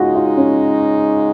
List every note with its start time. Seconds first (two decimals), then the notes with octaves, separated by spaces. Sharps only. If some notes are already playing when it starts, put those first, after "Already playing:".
Already playing: C#3 G#3 D#4 F4 F#4
0.15 F4
0.37 C#4